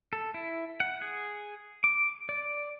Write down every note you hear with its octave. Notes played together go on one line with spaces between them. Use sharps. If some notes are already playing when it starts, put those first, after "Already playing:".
A4
E4
F#5
G#4
D6
D5